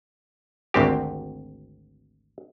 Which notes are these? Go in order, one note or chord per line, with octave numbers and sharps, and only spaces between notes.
G#1 D2 C4 G4